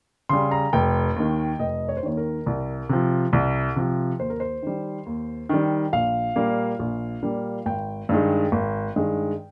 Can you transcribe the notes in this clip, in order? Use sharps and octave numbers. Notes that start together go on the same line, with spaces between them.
C#3 G3 C6
A#5
F1 G5
D#2 D#3
F1 D#5
C#5
C5
D#2 D#3 C#5
A#4
C2
C3 F3
C2
C3 F3
D#2 C5
A#4
C5
D#3 G3
D#2
D#3 G3
A#1 F5
A#2 G3 A#3
A#1
A#2 G3 A#3
G#1 G5
G2 D#3 G#3
G#1
G2 D#3 G#3